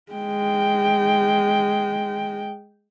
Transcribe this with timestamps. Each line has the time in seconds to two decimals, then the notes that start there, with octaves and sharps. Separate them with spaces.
0.13 G#3 G5